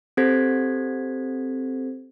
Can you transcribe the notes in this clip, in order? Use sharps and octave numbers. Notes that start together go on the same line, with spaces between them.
C4 G4 A4 C5 G#6 B6